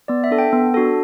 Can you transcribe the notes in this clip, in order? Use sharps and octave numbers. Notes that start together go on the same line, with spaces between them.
B3 D5
E5
D4 A4
G5
B3
D4 F#4 A4